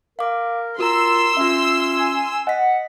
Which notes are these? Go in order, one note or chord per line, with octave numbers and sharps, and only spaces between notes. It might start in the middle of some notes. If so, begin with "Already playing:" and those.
A#4 F5 D6
F4 F#4 A#4 A#5 C6 E6
C#4 F4 E5
G#5
D#5 F#5 B6